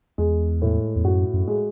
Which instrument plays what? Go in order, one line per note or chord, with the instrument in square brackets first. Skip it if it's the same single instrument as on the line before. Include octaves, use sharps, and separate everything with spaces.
[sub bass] E2 [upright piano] G#3
[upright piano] A2
[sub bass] E2
[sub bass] F#2 [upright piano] F#4
[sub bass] F#2
[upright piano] G#3